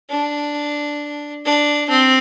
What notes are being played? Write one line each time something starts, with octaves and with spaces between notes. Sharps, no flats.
D4
D4
C4